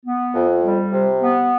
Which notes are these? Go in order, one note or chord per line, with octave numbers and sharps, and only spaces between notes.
B3
F2
G3
C3
B3